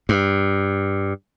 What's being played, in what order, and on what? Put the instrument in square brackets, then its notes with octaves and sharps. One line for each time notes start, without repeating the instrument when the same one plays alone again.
[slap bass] G2